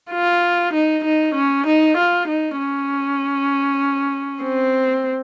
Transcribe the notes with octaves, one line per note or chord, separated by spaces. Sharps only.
F4
D#4
D#4
C#4
D#4
F4
D#4
C#4
C4